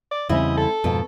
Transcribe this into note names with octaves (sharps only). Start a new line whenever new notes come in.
D5
E2 C#3 G3 C4 E4 D#5
A4
F2 G#2 B2